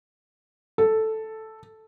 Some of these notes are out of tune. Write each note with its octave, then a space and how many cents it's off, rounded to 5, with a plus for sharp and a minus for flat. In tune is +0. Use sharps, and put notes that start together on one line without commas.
A4 +0